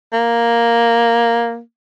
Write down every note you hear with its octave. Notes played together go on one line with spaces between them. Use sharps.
A#3